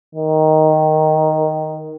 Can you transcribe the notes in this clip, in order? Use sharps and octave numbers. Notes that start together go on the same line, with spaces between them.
D#3